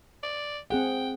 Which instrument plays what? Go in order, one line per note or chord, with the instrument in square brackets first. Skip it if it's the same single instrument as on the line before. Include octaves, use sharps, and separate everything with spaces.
[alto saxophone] D5
[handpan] C4 G#4 F#5 [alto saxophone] G5